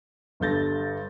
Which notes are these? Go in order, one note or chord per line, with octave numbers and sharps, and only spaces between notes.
G1 G2 A4 G6 A6 A#6